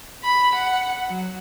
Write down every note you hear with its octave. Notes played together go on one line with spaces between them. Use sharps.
B5
F#5
F#3